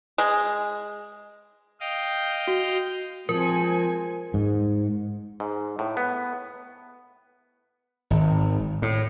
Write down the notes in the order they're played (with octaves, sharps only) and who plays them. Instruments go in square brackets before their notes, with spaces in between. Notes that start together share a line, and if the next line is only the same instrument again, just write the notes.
[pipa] G#3
[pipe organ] D#5 F5 G5
[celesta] F#4
[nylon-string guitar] F3 [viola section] G#3 C4 G#5 [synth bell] A#4
[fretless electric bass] G#2
[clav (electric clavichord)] G#2
A2
B3
[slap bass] G#1
A2